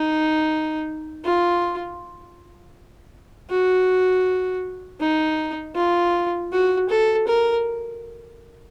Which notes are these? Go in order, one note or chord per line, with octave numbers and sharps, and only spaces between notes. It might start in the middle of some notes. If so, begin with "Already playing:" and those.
Already playing: D#4
F4
F#4
D#4
F4
F#4
A4
A#4